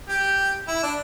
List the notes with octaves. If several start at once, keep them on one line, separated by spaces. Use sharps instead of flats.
G4
E4
D4